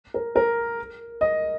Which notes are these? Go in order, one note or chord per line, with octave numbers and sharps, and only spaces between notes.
A#4
A#4
D#5